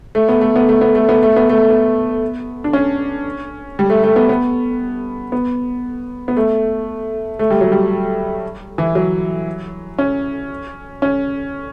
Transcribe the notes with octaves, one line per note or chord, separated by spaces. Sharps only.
A3
B3
A3
B3
A3
B3
A3
B3
A3
B3
A3
B3
D4
C#4
G3
A3
A3
B3
B3
B3
B3
A3
A3
G3
F#3
G3
E3
F#3
C#4
C#4